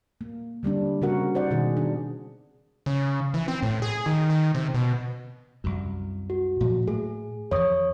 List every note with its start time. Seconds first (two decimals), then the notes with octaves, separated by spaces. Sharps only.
0.21 A#3
0.63 D3 G3 C4 D4
1.02 C#3 C4 F#4 A#4 F#5
1.34 D#4 C5 D5 F#5
1.51 B2 D#3 G#4
1.77 D4
2.86 C#3
3.34 E3
3.48 C4
3.63 A2
3.82 G#4
4.06 D#3
4.30 D#3
4.55 C3
4.74 B2
5.64 C2 F#2
6.30 F#4
6.61 A#2 F3 F#3
6.88 A2 G#4
7.51 F2 E3 C#5 D#6